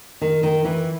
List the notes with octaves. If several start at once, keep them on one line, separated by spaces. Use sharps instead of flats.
D#3
D#3
E3